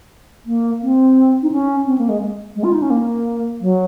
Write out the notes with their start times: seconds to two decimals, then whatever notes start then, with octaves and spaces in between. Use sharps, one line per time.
0.46 A#3
0.82 C4
1.43 D#4
1.52 C#4
1.86 C4
1.98 A#3
2.09 G#3
2.56 G#3
2.64 F4
2.73 D#4
2.82 C#4
2.90 A#3
3.61 F#3